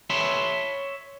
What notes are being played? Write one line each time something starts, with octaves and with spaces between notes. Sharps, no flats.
C#5 E5 A5 B5 C6